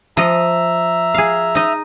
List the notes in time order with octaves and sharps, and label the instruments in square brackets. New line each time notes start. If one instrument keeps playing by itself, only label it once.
[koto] F3 D#5 [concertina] E5 A#5
[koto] G#4 F5
D#4 D#5